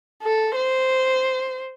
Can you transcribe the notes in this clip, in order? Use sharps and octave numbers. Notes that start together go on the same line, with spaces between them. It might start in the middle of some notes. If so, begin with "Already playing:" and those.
A4
C5